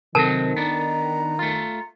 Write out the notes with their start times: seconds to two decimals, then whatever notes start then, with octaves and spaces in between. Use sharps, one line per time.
0.15 C3 D#3 F#3 C4 A4 A#4 A5
0.56 B3 D4 A#5
1.39 A3 F4